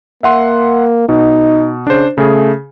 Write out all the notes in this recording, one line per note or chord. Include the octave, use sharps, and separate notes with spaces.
A#3 E5 F#5 C6
B2 D#4
C#3 D4 C5
C#3 A3 G#4